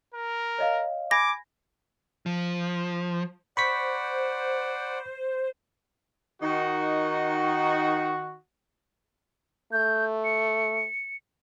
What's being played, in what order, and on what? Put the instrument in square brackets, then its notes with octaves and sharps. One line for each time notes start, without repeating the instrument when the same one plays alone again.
[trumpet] A#4
[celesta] C#5 D#5 F5
[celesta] G#5 B5 G#6 [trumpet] D6 [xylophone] A#6
[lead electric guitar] F3
[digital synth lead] C5 [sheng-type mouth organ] D5 F#5 [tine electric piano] B5 C#6 B6
[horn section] D#3 D#4 F#4
[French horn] A3 [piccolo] G6
[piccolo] C#7